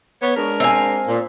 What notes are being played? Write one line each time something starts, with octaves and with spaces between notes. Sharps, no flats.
B3 C#5
G#3 D4 A#4
C4 F5 G#5
A#2